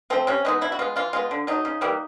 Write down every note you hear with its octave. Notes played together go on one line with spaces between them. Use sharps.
F3 A3 C4
C3 C#4
E3 G#3 B3 D#4
B2 E4
F#4
G#3 B3 F4
E3 F4
G#3 B3 F4
D3
F#3 A3 D#4
C#3
E3 G3 A#3